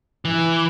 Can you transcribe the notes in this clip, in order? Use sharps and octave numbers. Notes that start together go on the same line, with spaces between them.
E3